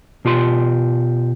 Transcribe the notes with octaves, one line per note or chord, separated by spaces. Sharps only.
B2 F4 G4 C6